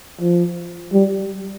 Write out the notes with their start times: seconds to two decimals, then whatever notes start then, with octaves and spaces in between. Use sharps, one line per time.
0.21 F3
0.93 G3